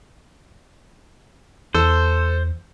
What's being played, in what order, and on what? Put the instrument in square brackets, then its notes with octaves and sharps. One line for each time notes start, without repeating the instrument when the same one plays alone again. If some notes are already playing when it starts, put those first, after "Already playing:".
[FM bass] E2 [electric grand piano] A4 E6 [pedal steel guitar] C5